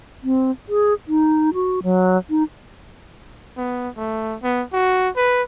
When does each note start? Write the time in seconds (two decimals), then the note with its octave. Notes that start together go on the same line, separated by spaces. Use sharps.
0.24 C4
0.69 G#4
1.08 D#4
1.54 F#4
1.83 F#3
2.30 D#4
3.57 B3
3.97 A3
4.43 B3
4.73 F#4
5.16 B4